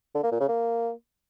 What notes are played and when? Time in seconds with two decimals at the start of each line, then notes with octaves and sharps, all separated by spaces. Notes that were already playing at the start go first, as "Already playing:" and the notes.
0.15 D3
0.23 A#3
0.32 A#2
0.40 C#3
0.49 A#3